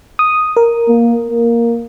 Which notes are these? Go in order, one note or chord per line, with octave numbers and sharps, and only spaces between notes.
D#6
A#4
A#3
A#3